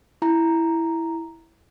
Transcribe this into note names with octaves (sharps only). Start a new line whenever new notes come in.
E4 A#5